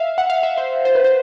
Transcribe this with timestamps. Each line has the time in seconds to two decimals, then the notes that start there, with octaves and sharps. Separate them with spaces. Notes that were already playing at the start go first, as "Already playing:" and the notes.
Already playing: E5 F5
0.18 F#5
0.30 F5
0.43 E5
0.58 C5
0.85 C5
0.95 B4
1.04 C5